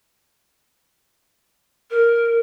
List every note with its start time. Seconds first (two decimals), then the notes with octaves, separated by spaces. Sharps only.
1.91 A#4